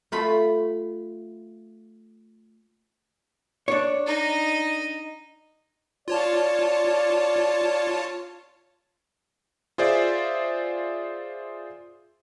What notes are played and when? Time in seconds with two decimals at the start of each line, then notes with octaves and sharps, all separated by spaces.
0.12 A3 F4 B5
3.68 D4 C#5
4.06 D#4 D#5
6.08 F4 C#5 D5 A5
9.78 F4 G#4 C5 D5 E5